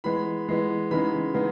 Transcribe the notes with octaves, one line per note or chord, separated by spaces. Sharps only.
E3 G#3 B3 B5
E3 G#3 B3
C#3 E3 G#3 B3 D#4 B5
C#3 E3 G#3 B3 D#4